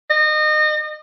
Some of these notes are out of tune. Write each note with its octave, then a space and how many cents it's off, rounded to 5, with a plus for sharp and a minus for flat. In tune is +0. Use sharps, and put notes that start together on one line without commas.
D#5 -30